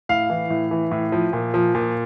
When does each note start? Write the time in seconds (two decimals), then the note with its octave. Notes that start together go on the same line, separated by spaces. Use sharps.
0.09 A2 F5
0.30 E3
0.50 A2
0.71 E3
0.91 A2
1.12 F3
1.33 A#2
1.54 F3
1.75 A#2